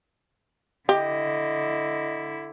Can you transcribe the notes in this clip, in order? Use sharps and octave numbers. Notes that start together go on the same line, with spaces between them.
D3 E4 G4 D#5